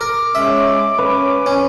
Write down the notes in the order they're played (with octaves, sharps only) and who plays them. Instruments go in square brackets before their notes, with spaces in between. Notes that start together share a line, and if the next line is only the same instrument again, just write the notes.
[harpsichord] A#4 [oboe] D6
[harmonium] G#3 C#4 [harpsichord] E5
[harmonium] C#4 [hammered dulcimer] B4
[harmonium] F2 [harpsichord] C#4